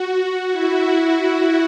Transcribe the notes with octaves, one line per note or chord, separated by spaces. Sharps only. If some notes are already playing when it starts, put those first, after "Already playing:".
Already playing: F#4
E4